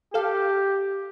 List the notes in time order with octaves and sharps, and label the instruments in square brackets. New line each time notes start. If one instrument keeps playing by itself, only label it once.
[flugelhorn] G4 [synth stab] A4 F5